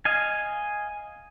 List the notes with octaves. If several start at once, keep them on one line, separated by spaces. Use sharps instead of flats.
D#5 F5 G#5